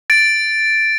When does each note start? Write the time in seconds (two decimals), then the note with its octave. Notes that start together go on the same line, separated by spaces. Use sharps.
0.10 A6 D7